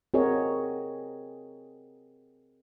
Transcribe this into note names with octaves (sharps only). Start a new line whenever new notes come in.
C4 F#4 G#4 A#4 C#5 D#5